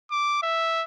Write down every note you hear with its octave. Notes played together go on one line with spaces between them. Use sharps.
D6
E5